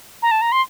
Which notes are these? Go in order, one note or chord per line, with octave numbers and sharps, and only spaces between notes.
A#5
A5
A#5
C6